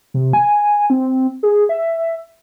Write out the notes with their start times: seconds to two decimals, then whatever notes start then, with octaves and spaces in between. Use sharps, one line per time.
0.14 C3
0.33 G#5
0.90 C4
1.43 G#4
1.69 E5